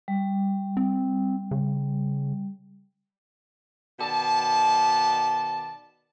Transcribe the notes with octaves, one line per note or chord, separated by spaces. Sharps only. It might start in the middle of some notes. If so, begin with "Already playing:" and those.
G3
C4
C#3
B2 D#3 D5 A5